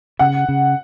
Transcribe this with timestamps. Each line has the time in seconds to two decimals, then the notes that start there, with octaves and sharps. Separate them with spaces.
0.19 C#3 F#5
0.49 C#3